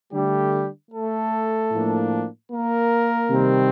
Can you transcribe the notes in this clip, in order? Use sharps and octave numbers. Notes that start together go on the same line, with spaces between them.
D3 G3 A3 D4 G4
A3 A4
A2 F3 A#3 D4
A#3 A#4
C3 D#3 G3 C4